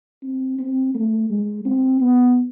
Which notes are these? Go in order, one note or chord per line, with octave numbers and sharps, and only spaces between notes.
C4
C4
A3
G#3
C4
B3